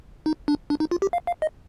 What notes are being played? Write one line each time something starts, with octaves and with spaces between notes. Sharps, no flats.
D#4
D4
D4
D#4
F4
G4
F5
F5
D#5